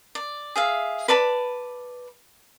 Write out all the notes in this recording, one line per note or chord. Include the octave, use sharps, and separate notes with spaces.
D5
G#4 E5 F5
B4 D5 A5 B5